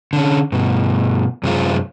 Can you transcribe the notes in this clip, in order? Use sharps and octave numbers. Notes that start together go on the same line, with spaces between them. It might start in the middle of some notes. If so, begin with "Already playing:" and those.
D3 C#4
G2 B2
F#2 C3 G#3 C4 F4